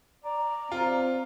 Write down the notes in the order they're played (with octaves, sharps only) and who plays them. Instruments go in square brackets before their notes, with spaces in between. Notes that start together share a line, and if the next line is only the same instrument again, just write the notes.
[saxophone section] D5 [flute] A#5
[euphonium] C4 [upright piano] F4